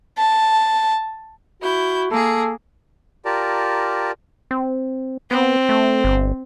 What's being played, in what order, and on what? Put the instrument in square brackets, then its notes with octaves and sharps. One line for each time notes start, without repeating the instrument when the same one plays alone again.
[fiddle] A5
[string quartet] E4 G6 [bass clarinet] F#4
[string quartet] A#3 G#4 [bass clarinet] A4
[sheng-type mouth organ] F4 G4 A#4 D5 A5 A#5
[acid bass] C4
[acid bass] B3 [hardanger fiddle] C4
[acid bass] A3
G1